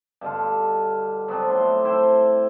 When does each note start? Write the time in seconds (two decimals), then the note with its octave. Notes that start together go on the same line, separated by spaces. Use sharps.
0.21 G2 B2 D3 F4
1.28 F#3 B3 C4 D4
1.49 A2 C6
1.85 E4 C5 G5